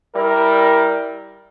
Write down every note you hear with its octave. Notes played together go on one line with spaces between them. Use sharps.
G3 E4 A#4